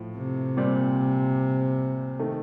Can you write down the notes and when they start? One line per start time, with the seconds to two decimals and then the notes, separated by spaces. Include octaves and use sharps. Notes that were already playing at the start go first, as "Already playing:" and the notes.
Already playing: A2 F3
0.17 C3
0.57 A#2 G3 C4
2.19 D#3 A3